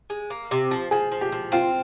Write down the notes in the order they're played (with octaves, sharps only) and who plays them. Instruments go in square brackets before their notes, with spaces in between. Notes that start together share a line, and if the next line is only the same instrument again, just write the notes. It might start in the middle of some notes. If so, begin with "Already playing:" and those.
[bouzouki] G#3
A#3
C3
F3
[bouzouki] F3 [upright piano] G#4
[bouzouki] F3
[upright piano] G4
[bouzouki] F3
[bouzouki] C4 [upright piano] F4